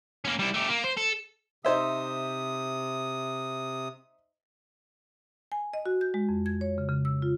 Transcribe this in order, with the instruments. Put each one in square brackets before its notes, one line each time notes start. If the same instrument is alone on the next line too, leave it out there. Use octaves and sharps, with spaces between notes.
[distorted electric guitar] A#3 C#4
G3 E4
A3 G4
A#3
C5
A4
[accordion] C3 D#6 [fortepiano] D#4 C5 E5
[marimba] G#5
D#5
F#4
G6
G#3
F2
G#6
C#5
C#3
C#3
E6
F4